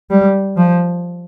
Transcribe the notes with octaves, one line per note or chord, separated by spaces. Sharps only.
G3
F3